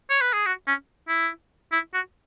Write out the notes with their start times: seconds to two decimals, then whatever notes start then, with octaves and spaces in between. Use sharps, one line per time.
0.10 C#5
0.21 B4
0.33 G#4
0.46 F#4
0.67 C#4
1.09 E4
1.72 E4
1.94 F#4